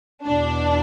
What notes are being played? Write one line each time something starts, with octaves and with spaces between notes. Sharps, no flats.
E2 B2 D4